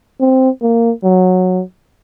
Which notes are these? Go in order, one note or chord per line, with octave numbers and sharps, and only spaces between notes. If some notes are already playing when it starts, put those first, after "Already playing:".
C4
A#3
F#3